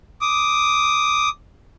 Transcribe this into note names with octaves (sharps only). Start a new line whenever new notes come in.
D6 D#6